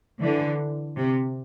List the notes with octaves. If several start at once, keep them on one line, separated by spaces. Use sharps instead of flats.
D3 E3
C3